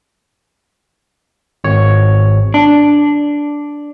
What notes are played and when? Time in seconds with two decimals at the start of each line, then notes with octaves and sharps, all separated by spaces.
1.64 G#1 C#5
2.54 D4